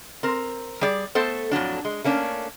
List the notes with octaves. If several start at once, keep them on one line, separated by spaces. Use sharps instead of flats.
C4 A#4
G3 G#4 D5
A3 B3 A4 C5
F2 A2 F#3 D4
G#3
A3 A#3 C#4 D4